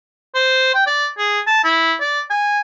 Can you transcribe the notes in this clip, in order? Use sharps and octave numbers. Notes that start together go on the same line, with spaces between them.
C5
G5
D5
G#4
A5
E4
D5
G#5